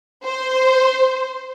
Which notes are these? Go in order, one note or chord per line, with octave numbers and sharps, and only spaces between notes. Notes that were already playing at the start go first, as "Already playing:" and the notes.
C5